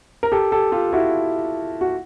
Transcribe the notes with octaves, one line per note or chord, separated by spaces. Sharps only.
A#4
G4 A4
G4 A4
F4 G4
E4 F#4
F#4